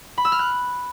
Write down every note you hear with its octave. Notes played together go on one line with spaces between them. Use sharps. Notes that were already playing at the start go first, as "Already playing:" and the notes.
B5
E6
F6
F#6